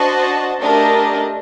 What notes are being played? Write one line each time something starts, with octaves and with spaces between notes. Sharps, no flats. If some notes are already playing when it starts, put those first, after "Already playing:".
Already playing: D4 F#4 C5 D#5 A5
A3 D4 G4 A#4 D#5